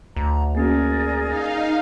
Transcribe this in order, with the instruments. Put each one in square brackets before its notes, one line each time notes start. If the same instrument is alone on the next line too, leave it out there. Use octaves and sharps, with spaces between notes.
[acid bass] D2 [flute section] A#5
[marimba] A#3 C#4 F#4 [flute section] G#4 A#4 D5
[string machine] D#4 F5